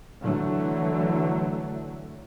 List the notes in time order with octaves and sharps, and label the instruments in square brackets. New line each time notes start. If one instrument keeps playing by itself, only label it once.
[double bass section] D3 E3 F#3 A3